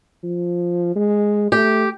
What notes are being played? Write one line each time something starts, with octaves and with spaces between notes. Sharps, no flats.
F3
G#3
A3 G4